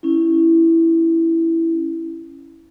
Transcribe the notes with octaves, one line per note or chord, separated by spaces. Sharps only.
C#4 E4